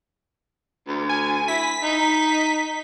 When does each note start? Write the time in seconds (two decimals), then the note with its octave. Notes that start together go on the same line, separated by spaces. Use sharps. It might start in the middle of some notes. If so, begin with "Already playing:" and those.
0.88 D2
1.09 G#5
1.48 E4 B6
1.83 D#4